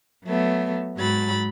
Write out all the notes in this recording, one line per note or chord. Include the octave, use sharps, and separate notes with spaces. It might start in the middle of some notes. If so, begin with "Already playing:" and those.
F#3 A3 B3
G#2 F#3 B5 A6